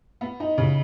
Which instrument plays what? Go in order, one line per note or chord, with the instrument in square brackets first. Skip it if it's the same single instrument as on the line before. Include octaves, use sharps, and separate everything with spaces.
[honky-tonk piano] B3
D#4
C#3